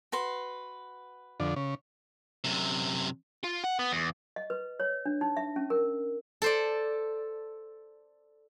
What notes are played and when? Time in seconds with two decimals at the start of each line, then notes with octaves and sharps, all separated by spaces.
0.12 F#4 B4 C6
1.40 F2 D3
1.56 C#3
2.44 F#2 C3
3.44 F4
3.64 F#5
3.79 B3
3.92 E2
4.36 D#5
4.50 B4
4.80 C#5
5.06 D4
5.21 D#4
5.37 E5
5.56 C#4
5.70 A#4
6.42 A4 C5 D5